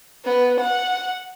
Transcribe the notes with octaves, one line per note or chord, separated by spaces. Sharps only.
B3
F#5